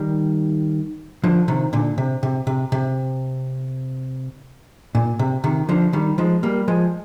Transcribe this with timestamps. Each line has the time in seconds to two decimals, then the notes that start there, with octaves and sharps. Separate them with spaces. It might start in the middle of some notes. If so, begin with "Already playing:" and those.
Already playing: D#3 G3
1.24 D3 F3
1.48 C3 D#3
1.73 A#2 D3
1.98 C3
2.23 C3
2.47 C3
2.72 C3
4.95 A#2
5.19 C3
5.44 C3 D#3
5.69 D3 F3
5.93 D#3 G3
6.18 F3 G#3
6.43 G3 A#3
6.68 F3 G#3